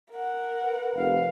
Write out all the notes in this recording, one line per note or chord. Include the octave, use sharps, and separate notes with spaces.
A#4 F#5
B4
F1 F5